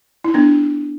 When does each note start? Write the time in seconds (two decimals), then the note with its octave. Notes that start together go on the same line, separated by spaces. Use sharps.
0.24 E4
0.34 B3 D4